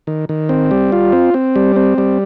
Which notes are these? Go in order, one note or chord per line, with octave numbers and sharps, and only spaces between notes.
D#3
D#3
C4
G3
F4
C4
C4
G3
C4
G3